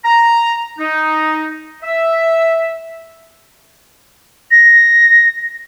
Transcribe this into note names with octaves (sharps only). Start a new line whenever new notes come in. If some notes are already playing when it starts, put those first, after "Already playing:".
A#5
D#4
E5
A#6